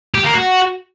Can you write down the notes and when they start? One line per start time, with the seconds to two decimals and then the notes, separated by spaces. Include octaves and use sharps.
0.14 G4
0.24 A#3
0.34 F#4